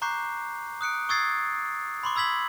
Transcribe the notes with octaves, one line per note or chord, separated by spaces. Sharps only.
A#5 C#6 D6 F#6 G6 C7
D#6 F#6 C#7 D7
C#6 D#6 E6 G#6 A6 C7
B5 C6 D6
B5 E6 G#6 B6 F#7